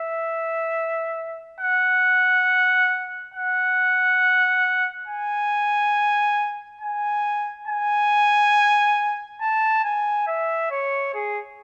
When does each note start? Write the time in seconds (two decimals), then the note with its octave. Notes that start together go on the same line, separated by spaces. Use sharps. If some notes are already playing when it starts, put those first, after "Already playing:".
Already playing: E5
1.61 F#5
3.34 F#5
5.08 G#5
6.81 G#5
7.68 G#5
9.41 A5
9.85 G#5
10.27 E5
10.71 C#5
11.14 G#4